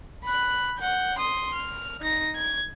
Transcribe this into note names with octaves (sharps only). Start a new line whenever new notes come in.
B5 F#6
F#5 G6
C6 D#6
F6
D#4 A#6
G#6